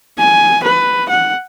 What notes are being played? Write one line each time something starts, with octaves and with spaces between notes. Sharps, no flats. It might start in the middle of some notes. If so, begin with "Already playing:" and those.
G#5
B4
F#5